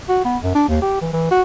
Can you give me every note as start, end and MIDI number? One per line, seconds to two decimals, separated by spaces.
0.09 0.20 66
0.25 0.37 59
0.43 0.54 42
0.55 0.64 62
0.68 0.81 39
0.82 1.01 67
1.01 1.10 52
1.13 1.28 52
1.31 1.42 66